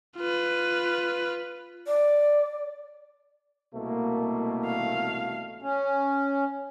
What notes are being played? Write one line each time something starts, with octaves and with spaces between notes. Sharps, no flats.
F4 B4
D5
C2 B2 A3 A#3
F5
C#4